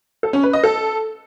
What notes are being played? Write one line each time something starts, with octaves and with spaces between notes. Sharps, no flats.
A4
C#4
B4
D#5
A4